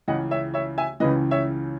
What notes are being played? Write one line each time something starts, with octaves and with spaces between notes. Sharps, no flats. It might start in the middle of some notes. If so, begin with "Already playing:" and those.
C#2 C#3 E3 D#5 F#5
C#5 E5
C#5 E5
E5 G#5
C#2 C#3 E3 B4 D#5
C#5 E5